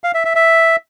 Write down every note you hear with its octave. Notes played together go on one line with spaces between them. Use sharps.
F5
E5
E5
E5